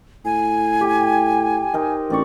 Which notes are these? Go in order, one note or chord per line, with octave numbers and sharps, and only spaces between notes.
A2 G#5
G4
D#4 A#4 C5
A1 C4 D5 C#6